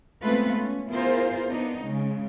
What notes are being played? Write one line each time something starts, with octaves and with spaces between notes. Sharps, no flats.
G#3 A3 B3 C4 F4 B4
C#4
B3 E4 F4 G#4 A#4 C5
B3 D4 D#4
C#3 G#3